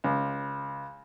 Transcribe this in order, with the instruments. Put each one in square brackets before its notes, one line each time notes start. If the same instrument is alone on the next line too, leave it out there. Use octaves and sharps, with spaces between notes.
[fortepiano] C#2